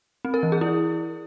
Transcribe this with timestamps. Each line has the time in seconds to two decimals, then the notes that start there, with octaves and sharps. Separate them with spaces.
0.25 C4
0.34 A#4
0.43 E3
0.52 G#4
0.61 E4